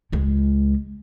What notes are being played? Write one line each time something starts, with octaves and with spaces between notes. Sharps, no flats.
C#2 G#3